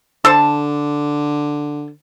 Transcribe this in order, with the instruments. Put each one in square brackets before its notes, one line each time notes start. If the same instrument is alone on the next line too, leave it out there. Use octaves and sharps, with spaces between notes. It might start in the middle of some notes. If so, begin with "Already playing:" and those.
[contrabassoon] D3 [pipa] A4 C5 A5